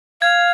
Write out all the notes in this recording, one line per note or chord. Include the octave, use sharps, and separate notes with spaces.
F5 G#6